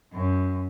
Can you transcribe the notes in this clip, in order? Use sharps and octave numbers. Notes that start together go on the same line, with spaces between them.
F#2